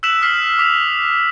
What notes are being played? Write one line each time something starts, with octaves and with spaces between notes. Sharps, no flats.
E6 F#6 B6 E7 F#7
D#6 F6 B6 C7
D6 B6 F7